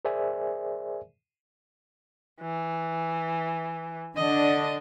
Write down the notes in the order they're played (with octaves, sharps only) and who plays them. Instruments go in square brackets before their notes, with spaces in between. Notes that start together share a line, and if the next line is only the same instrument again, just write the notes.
[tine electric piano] G#4 A#4 C5 D5 E5 G#5
[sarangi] E3
[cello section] D3 D4 [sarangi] D#5